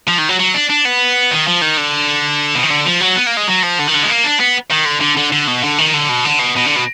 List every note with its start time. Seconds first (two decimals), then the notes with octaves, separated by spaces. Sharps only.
0.08 F3
0.18 D#3
0.29 F#3
0.39 F#3
0.54 D4
0.70 D4
0.85 B3
1.31 D#3
1.47 F3
1.62 D#3
1.77 D3
2.55 B2
2.63 D#3
2.70 D3
2.85 F3
3.00 F#3
3.16 B3
3.26 A#3
3.37 G#3
3.47 F#3
3.62 F3
3.78 D3
3.87 D#3
3.94 D3
4.03 G#3
4.09 A#3
4.24 D4
4.40 B3
4.71 D#3
4.85 D3
5.01 D3
5.17 D3
5.32 D3
5.47 B2
5.63 D3
5.78 D#3
5.94 D3
6.09 B2
6.25 D3
6.40 B2
6.56 B2
6.66 D3
6.76 B2